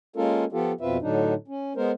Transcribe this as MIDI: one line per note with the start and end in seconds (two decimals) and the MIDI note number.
0.16 0.45 56
0.16 0.45 58
0.16 0.45 61
0.16 0.45 65
0.16 0.45 69
0.16 0.45 70
0.52 0.72 53
0.52 0.72 59
0.52 0.72 65
0.52 0.72 67
0.52 0.72 69
0.81 0.97 41
0.81 0.97 47
0.81 0.97 60
0.81 0.97 65
0.81 0.97 71
0.81 0.97 76
1.02 1.34 45
1.02 1.34 50
1.02 1.34 54
1.02 1.34 62
1.02 1.34 63
1.48 1.73 61
1.76 1.92 56
1.76 1.92 59
1.76 1.92 70
1.76 1.92 72